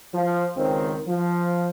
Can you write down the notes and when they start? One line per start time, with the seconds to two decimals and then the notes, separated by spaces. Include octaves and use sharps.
0.13 F3
0.56 C#2 D#3 C4
1.07 F3